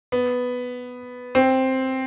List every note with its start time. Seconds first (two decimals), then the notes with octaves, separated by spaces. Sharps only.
0.12 B3
1.35 C4